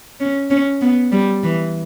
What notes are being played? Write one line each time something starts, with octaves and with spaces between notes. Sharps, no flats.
C#4
C#4
B3
G3
E3